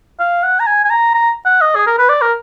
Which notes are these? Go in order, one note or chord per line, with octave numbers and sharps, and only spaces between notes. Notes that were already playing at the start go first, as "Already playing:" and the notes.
F5
F#5
A#5
G#5
G#5
A#5
A#5
F#5
D#5
G#4
A#4
B4
D5
A#4